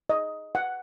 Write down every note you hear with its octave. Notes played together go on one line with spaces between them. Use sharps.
D#5
F#5